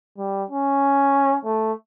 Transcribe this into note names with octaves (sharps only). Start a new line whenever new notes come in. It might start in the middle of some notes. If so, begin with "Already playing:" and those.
G3
C#4
A3